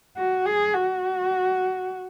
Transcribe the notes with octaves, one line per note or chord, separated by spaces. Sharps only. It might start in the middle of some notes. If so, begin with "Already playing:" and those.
F#4
G#4
F#4